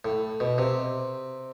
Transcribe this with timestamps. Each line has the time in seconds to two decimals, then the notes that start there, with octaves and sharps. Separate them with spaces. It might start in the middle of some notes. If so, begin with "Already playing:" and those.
0.05 A2
0.40 B2
0.58 C3